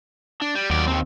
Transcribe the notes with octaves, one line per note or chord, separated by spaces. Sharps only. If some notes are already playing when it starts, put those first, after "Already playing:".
D4
G3
D#2 F#3 D5
D#3 C4